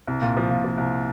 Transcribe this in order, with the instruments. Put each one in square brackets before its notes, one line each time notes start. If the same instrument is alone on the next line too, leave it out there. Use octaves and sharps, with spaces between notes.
[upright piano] C2
A#2
F3
A#2
F3
C2